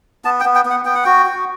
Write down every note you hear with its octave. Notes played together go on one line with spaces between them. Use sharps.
B3 A5
G5
B3
G5
B3
F#5
B3 G5
F#5
F#4 G5
F#4